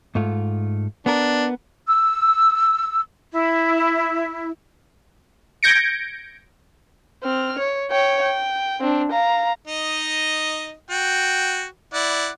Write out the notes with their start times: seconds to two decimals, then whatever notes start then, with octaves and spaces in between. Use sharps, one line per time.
0.15 G#2 A3 F4
1.06 B3 D4 A#4
1.88 E6
3.33 E4
5.63 G6 G#6 A#6 C#7 D7
7.23 C4 F6
7.59 C#5
7.91 C#5 G5
8.22 G5
8.80 C4 D4
9.11 F5 A#5
9.67 D#4 D#5
10.90 F#4 G5
11.94 E4 D5 F#5